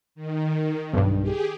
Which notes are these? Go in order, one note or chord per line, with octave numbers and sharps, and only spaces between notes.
D#3
B1 G2
G4 G#4